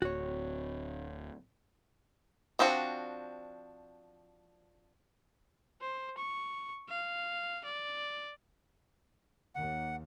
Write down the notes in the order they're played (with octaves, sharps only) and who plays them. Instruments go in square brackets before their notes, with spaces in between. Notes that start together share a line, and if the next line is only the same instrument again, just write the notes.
[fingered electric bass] D1 [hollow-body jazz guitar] F#4 C#5
[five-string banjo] F3 C4 D4 F#4
[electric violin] C5
C#6
F5
D5
[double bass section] D#2 [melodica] F#5